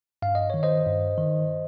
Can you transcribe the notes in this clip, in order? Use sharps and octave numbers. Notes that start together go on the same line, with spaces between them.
G2 F5
D#5
D#3 C#5
C5 D#5
G2
D#3